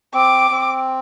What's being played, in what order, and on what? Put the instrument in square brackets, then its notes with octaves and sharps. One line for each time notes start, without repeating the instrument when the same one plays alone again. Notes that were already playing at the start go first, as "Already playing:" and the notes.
[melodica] C4 [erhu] D6
[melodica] C4